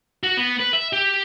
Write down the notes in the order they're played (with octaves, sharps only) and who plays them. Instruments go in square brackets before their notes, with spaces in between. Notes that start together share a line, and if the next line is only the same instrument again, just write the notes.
[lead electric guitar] F#4
B3
B4
E5
G4